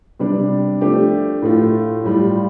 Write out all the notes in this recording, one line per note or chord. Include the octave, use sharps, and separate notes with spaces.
C3 G3 D4
F3 A3 D4 G4
A2 A3 F4
A2 G3 F4